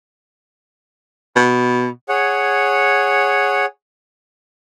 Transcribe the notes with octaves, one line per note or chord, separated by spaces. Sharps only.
B2
G#4 C#5 F#5